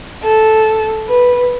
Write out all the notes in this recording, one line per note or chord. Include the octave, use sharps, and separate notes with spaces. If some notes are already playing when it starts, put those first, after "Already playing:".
A4
B4